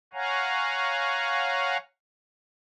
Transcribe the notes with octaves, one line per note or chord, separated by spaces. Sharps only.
C#5 F5 F#5 G#5 A#5